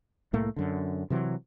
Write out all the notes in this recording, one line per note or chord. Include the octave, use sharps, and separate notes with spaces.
C2 A2 A3 A#3
F#2 D3
C3 E3 F#3